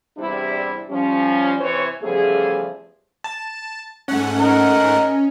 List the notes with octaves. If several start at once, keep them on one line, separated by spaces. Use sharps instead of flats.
E2 C3 G3 D4 E4
F3 G3 C#4
C3 E3 C5 C#5
E2 C#3 F3 G3 A3 G#4
A5
G#2 A3 C#4 F#5
A#4 D#5